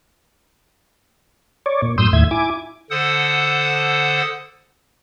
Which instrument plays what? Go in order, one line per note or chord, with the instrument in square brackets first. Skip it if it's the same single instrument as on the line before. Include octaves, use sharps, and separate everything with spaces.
[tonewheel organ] C#5 D5
A#2
F#2 A2 C6 D#6 E6 G6
D#2 A2 E5 G#6
E4 G#5 D6
[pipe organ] D3 A4 C5 F#5 D#6